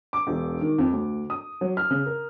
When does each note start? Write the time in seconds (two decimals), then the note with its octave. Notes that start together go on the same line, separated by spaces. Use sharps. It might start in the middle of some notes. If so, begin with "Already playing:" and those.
0.13 D6
0.27 E1
0.61 D#3
0.78 F2
0.93 D2
1.30 D#6
1.61 F#3
1.77 F6
1.91 C#3
2.06 A#4